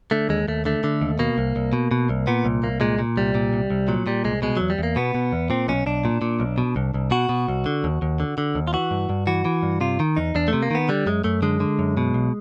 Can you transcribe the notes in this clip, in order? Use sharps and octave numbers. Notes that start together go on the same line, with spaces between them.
D3 A3
D#2 G#3
D#2 A3
D3 A3
D3
D#2
B2 A#3
C2
C2
B2
B2
C2
A#2 B3
C2
C2 A#3
A#2 G#3
A#2
C2 G3
A#2
C2
C2
A#2 F#3
A#2 G3
C2 G#3
B2 G#3
E2 F#3
G3
E2 A#3
B2 B3
B2
E2
A#2 C4
B1 C#4
B1 D4
A#2
A#2
B1
B2
C2
C2
B2 F#4
B2
C2
D3
D#2
D#2
D3
D3
D#2
F4
E3 F#4
G2
G2
E3 F#4
E3
G2
C3 F4
D#3
E2 D#4
E2 D4
C3 A3
A#3
D#3 B3
D3 G3
F#2 G#3
F#2 A3
D3 G#3
D3
F#2
B2
B1